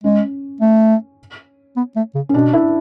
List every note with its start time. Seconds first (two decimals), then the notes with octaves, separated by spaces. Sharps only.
0.04 G#3 C#4
0.61 A3
1.76 B3
1.96 A3
2.15 C#3
2.29 C#4
2.34 B2 D4
2.53 E4